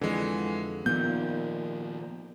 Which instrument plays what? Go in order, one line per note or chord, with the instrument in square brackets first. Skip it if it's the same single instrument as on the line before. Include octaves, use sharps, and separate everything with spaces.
[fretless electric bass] F2 D3 [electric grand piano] E3 G#3
[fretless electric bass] A#2 D#3 [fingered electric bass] F3 B3 [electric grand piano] G6